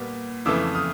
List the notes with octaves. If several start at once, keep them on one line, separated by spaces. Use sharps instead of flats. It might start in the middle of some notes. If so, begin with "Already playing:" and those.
Already playing: A#2 G3 B3
F2 C#3 E3 A3 D6 E6
D#6 F6